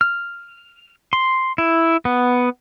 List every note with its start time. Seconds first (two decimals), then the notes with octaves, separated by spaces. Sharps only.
0.01 F6
1.13 C6
1.58 E4
2.05 B3